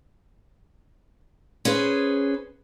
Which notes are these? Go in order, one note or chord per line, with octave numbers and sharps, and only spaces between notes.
C#4 G#4 B4 C5